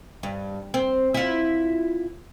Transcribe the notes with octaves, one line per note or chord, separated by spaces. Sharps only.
G2
C4
E4 F4